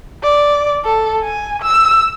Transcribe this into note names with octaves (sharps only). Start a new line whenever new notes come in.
D5
A4
G#5
E6